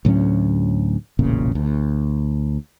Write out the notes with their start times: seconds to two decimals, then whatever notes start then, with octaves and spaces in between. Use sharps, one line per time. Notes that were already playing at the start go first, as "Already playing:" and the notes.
0.05 D2 A2 F#3 C#4
1.19 E1 A1 A#2 C#3
1.55 D2